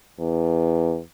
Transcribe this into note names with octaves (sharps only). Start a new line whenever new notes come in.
E2